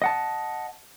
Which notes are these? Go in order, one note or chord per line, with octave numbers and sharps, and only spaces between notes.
D#5 F#5 A5